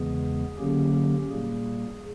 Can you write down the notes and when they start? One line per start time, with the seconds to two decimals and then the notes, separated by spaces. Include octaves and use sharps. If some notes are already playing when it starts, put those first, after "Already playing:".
Already playing: E2 C#3 E3 G#3 B3 G#4
0.58 D3 F#3 A#3 C#4 G4
0.93 G4
1.28 A#2 G3 A#3 G#4